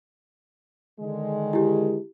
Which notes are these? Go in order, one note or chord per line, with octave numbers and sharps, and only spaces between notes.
D3 D#3 G#3
E4 G4